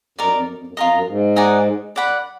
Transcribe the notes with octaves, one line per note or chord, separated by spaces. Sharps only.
F#2 D#4 A#4 D5
F2
F#2
F2
F#2
F2 F4 A#4 D#5
F#2
G#2
D#4 G#4 D5 F#5
D5 F#5 B5
F#2